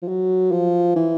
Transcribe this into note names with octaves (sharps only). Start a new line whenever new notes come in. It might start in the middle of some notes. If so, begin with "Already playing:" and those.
F3
F#3
F3
E3